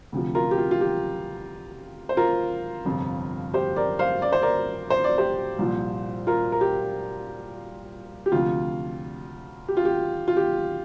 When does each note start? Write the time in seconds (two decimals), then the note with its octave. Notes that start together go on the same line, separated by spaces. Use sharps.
0.12 D2 C3 F3
0.35 F4 A#4
0.51 G4
0.58 F4
0.71 F4
0.81 G4
2.09 C5
2.17 F4 A#4
2.85 G1 F2 C3 F3
3.54 G4 C5
3.76 A#4 D5
3.99 C5 F5
4.22 D5
4.32 C5
4.42 A#4 D5
4.90 C5
5.04 D5
5.18 G4 C5
5.58 C2 A#2 F3
6.27 F4 A#4
6.52 A#4
6.61 G4
8.26 G4
8.32 D2 C3 F3 F4
9.68 G4
9.77 F4
9.85 G4
10.28 F4
10.37 G4